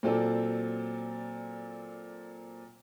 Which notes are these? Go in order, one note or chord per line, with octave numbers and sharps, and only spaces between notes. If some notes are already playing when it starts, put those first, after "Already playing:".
A#2 F#3 C4 F4 A4 D5